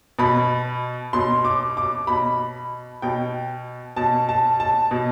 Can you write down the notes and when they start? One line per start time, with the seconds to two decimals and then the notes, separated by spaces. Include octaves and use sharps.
0.19 B2 B5
1.13 B2 C6
1.45 D6
1.77 D6
2.07 B2 B5
3.02 B2 G5
3.96 B2 A5
4.29 A5
4.60 A5
4.91 B2